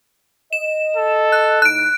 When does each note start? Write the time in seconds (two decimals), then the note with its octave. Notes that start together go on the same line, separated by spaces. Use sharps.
0.53 D#5 E7
0.96 A4
1.32 F#6
1.62 A2 D#4 F#6 D7